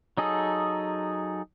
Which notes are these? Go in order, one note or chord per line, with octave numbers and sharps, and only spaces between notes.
F#3 D#4 G#4 A4